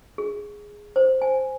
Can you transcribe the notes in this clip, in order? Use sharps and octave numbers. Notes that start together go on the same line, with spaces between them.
G#4
C5
G#5